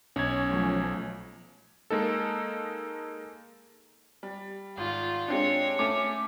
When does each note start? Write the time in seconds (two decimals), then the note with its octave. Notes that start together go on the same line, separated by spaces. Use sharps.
0.16 B1 C#4 G#6
0.47 F3 F#3 A3
1.90 G#3 A#3 D#4 A4
4.23 G3
4.77 G#1 F4
5.28 G#3 C4 D4 C#5
5.79 A3 C#4 D6